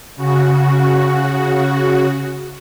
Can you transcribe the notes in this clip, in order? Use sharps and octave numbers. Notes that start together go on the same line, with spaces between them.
C#3 F#4